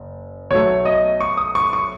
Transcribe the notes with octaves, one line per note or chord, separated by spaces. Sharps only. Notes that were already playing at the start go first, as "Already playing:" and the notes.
Already playing: F#1
B1 B2 F#3 A3 C#5
D#5
C#6
D#6
C#6
C#6